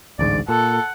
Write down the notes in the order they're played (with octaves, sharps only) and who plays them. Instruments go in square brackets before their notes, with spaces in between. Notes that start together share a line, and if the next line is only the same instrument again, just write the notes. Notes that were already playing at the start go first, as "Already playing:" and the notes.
[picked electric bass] A1 D2 G#2 [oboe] D5
[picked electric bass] A#2 [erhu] A4 [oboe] F#5